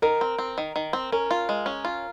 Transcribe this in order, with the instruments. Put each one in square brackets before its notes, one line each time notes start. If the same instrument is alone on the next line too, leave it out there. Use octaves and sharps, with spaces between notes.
[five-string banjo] D#3 [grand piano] A#4
[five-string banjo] C4
C4
D#3
D#3
C4
[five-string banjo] C#4 [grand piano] A#4
[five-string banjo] F4
G#3
C#4
F4